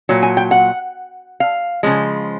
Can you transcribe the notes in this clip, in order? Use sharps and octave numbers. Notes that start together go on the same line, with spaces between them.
A#2 F#3
G#5
G5
F#5
F5
C#3 F3 G#3